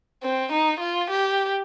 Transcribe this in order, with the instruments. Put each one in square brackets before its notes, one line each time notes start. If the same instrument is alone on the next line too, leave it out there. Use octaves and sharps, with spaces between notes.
[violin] C4
D#4
F4
G4